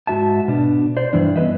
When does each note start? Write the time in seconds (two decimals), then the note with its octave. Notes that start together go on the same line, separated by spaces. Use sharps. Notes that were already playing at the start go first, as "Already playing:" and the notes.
0.07 G#2 G#3 F#4 E5 A5
0.48 B2 D4
0.97 C5 D5
1.13 G2 E3 D4
1.36 B3 C#4 A#4 B4 D#5 E5